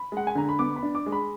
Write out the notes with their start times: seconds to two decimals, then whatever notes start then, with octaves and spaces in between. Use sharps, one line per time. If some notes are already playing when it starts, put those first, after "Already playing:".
Already playing: B5
0.12 G#3 F#5
0.27 G#5
0.35 D3 A#5
0.49 B5
0.59 B3 D6
0.76 B5
0.83 D4
0.95 D6
1.06 G#3
1.12 B5